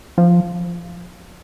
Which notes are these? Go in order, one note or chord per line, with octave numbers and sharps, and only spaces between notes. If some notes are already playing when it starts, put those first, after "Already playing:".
F3